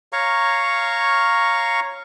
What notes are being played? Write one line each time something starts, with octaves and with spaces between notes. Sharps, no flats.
C#5 F5 A#5 C#6